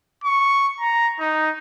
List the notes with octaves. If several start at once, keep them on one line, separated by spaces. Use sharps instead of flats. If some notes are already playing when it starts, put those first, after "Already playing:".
C#6
A#5
D#4